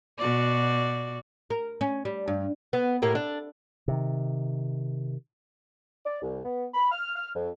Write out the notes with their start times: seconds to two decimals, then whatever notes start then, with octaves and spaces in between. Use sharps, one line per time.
0.18 B2 F#4 D5
1.50 A#4
1.81 C#4
2.05 G3
2.28 G2
2.73 B3
3.02 A2 A#3 G4
3.15 D4
3.88 C3 D#3
6.05 D5
6.22 C2
6.44 B3
6.74 B5
6.92 F6
7.16 F6
7.35 F2